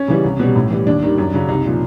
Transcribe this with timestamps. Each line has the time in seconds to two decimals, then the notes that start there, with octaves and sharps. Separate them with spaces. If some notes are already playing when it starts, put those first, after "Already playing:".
Already playing: C#4
0.08 C#3 E3 G3
0.24 C2
0.40 B2 G3
0.56 A2
0.70 E3 G3
0.87 D#2 D4
1.03 D#3 G3
1.18 F#2
1.34 C#3 F#3
1.49 C2 D#4
1.65 A#2 F3